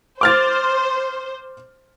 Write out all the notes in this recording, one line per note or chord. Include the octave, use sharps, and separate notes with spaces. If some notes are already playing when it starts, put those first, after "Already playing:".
C5 D6 F6 A6